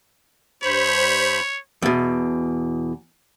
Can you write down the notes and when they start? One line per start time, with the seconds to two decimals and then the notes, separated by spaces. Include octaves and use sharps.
0.63 G2 C5 C#5 B5
1.82 E2 B2